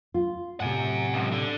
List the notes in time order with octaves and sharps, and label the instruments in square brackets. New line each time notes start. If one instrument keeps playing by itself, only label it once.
[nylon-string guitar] F4
[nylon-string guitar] A2 C3 [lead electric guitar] F#5 G#5
[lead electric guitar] C#2 F#2
D3